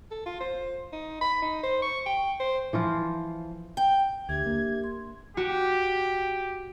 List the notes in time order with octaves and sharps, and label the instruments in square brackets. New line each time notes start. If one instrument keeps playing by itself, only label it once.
[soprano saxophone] A4
F4
C5
D#4
B5
D#4
C5
C#6
G5
C5
[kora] E3 F3 F4
[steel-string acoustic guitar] G5
[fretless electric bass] D2 [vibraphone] D4 G4 E5 [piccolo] G#6
[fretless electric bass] A#3
[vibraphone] C6
[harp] F#4 [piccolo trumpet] G4